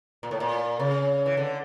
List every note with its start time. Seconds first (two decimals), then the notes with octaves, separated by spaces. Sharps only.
0.23 A#2
0.31 A2
0.40 A#2
0.79 C#3
1.26 E3
1.37 D3